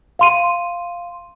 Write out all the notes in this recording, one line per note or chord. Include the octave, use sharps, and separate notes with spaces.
F5 C6 D#7